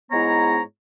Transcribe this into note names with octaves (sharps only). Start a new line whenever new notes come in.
G#2 G#3 B3 E4 C#5 A#5